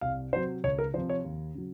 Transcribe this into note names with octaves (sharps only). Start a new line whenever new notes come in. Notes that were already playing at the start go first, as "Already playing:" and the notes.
C2 F5
C3 F#3 C5
C#2 C#5
A#4
C3 F3 C5
C#5
D#2
C#3 F#3